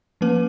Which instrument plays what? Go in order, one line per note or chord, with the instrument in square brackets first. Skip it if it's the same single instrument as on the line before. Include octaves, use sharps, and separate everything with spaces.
[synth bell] F3 A#3 C#4 B4